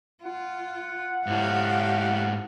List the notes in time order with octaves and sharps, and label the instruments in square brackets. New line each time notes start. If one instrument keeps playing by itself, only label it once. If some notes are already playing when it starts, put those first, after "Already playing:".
[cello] F4 [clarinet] F#5
[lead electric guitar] G#2 E4 [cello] G4 F5